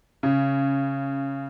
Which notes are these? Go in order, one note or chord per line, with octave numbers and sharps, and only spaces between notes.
C#3